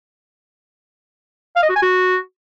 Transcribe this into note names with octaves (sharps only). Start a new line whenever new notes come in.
F5
D#5
F#4
G#5
F#4